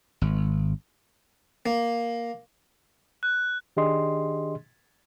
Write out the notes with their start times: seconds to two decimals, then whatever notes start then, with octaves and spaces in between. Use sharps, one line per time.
0.21 G#1
1.66 A#3
3.23 F#6
3.77 D#3 D4 G4 G#4 D#5 C6